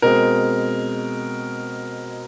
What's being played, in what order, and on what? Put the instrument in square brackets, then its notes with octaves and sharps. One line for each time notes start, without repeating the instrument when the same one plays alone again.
[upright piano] B2 G#3 C4 A#4